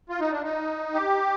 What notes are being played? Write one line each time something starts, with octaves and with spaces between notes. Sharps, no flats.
F4
D#4
D4
D#4
G4